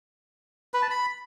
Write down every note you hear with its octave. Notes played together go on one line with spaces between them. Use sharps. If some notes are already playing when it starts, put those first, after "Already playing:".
B4
A5
B5